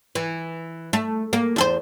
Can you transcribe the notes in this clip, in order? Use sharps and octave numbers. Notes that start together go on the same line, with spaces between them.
E3
A3
A#3
E2 A4 C5